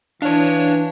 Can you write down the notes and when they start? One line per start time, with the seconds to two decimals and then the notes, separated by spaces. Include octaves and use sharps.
0.22 E3 D4 C#5 F5 A5